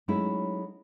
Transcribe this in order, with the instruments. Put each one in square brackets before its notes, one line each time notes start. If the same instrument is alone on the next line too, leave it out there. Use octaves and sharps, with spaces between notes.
[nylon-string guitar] F#3 G#3 A3 C#4 D#4 E4